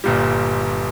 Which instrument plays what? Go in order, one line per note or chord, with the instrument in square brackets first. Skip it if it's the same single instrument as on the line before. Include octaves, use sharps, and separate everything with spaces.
[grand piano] G1 A#2 G3